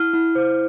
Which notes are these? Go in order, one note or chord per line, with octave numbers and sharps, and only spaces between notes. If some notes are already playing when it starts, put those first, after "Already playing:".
Already playing: E4 F6
E4
C5